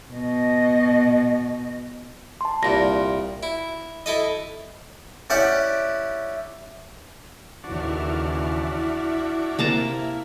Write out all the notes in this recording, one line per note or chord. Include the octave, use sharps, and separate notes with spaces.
B2 D#5
A5 C6
C2 A#2 A#6
E4
E4 A4 D#5
C#4 E4 G4 D5 F#5 G5
D#2 C#3 E3 D4 E4 F#4 E5 F6
C3 A#3 A5 A#5